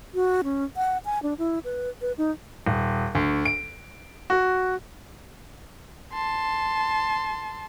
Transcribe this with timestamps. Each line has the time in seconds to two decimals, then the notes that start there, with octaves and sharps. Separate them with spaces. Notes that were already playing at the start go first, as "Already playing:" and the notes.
0.14 F#4
0.44 C#4
0.76 F#5
1.05 G#5
1.23 D4
1.38 E4
1.64 B4
2.01 B4
2.18 D#4
2.66 D#1
3.15 D2
3.45 D7
4.30 F#4
6.14 A5 C6